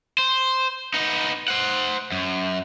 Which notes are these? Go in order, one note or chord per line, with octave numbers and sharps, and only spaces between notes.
C5
B3 D#4
C5 F#5
F#2